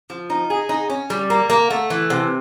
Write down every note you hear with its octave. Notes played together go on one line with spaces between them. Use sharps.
F3
D#4
G#4
D#4
C#4
G3
A#3
A#3
A3
E3
C3